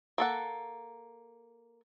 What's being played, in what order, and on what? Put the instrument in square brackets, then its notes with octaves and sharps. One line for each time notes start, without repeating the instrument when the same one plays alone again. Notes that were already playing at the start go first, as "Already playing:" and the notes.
[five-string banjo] A#3 A4 F#5